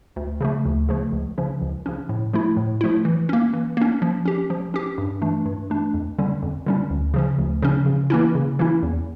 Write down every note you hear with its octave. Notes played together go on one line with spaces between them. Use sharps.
D2
C#3 F3 A3
D2
C#3 F3 A3
C#2
C#3 F3 C#4
C#2
C#3 F3 C#4
A2
F3 A3 E4
A2
F3 A3 E4
E3
A#3 C#4
E3
A#3 C#4
F3
C#4 G4
F3
C#4 G4
G2
E3 A3 D4
G2
E3 A3 D4
F2
D3 G3 C#4
F2
D3 G3 C#4
D2
C#3 F3 C#4
D2
C#3 F3 C#4
C#3
E3 A#3 C#4 E4
C#3
E3 A#3 C#4 E4
E2